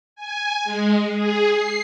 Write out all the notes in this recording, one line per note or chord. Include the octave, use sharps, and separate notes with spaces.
G#5
G#3
G#4
C7